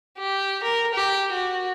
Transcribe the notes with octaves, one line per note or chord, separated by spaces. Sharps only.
G4
A#4
G4
F#4